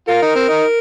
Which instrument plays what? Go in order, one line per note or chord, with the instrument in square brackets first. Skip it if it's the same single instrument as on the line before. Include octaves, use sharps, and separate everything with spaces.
[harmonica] F4 [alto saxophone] A#4
[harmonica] D#4
C4
D#4